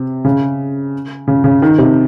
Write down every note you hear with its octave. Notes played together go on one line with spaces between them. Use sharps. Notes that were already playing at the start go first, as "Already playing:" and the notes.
Already playing: C3
C#3
C#3
C#3
D#3
C3